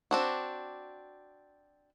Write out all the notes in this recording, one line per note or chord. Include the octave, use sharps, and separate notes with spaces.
C4 D4 F#4